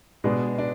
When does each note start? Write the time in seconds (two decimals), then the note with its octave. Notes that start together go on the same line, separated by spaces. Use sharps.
0.24 B2 G#3 B3 D4
0.58 D4